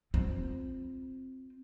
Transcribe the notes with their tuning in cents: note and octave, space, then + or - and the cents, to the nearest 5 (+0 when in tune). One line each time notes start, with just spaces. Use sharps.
C4 +0 F4 +15